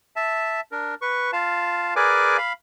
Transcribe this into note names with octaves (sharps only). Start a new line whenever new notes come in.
E5 A5
D4 A#4
B4 C#6
F4 F5 A5
G#4 A#4 B4 D5 G#5 D6
F5 B5